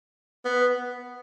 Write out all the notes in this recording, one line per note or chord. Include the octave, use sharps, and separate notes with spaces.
B3